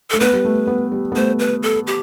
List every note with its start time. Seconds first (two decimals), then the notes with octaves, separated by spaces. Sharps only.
0.10 A3 A4
0.20 B3 B4
0.33 G3
0.45 A3
0.67 B3
0.92 G3
1.12 B3
1.15 A3 C5
1.39 B4
1.63 A4
1.87 G4